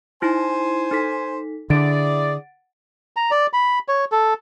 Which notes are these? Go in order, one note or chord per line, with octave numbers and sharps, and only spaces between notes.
D#4 E4 C5 G#5
D#4 A4 B6
D3 E4 G#4 D5 F#5 A6 D7
A#5
D5
B5
C#5
A4